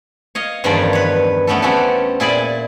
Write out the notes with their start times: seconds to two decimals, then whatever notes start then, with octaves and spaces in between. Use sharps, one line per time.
0.35 C#5 D#5 F5
0.64 E2 G2 D#3 F3 C#4 D5
0.93 B4 C#5
1.47 A3 B3 C#4 G4 A4
1.62 C4 C#4 F#4 G4 A4
2.20 A#2 E4 G#4 D5 G#5 B5